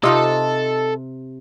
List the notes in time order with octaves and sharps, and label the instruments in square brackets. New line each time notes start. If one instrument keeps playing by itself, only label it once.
[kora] C3 [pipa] D#4 F4 D#5 [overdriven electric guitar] A4